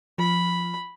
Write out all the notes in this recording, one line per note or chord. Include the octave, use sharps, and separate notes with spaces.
F3 B5